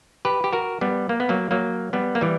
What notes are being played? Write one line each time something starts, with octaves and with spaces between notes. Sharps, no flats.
G4 B4
G4
F#4 A#4
G3 B3
A#3
B3
F#3 A#3
F#3 A#3
G3 B3
A#3
E3 G3